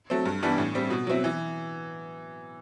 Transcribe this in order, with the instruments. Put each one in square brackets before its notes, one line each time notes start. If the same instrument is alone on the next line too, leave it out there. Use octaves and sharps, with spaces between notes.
[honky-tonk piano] F#3 A3 C4
G2
E3 G3 B3 D4
A2
G3 C4
B2
F#3 C4 E4
E3